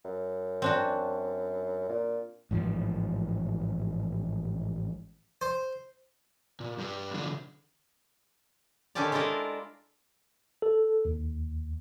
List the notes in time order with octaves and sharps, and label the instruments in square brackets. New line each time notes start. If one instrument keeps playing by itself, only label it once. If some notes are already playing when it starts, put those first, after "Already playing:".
[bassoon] F#2
[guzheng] C4 D4 F#4
[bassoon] A#2
[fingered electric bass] A1 G#2 B2 F3
[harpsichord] C5
[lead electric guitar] A#2
G2 G3
B1 D3
[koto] D3 D#3 C#4 D4 G4 D5
G#3 D4 E4 F4 A4 A#4
[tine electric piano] A4
D#2